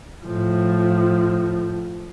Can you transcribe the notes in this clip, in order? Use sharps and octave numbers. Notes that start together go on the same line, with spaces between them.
A2 F3